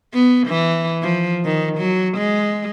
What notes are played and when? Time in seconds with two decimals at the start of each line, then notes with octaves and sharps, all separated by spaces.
0.14 B3
0.47 E3
1.02 F3
1.44 D#3
1.78 F#3
2.17 G#3